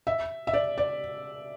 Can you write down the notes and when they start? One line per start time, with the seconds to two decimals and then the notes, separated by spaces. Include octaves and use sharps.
0.07 E5
0.47 E5
0.54 D5
0.78 D5